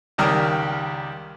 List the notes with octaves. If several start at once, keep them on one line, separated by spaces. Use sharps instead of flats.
C#2 D#3 G3 A#4 F6